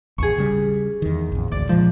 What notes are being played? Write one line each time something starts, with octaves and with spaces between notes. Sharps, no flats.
A1 D#2 G#4 C#6
C#3 G3
E2 D#3
A#1 F2
A1 D2 D5
A#2 F3 G#3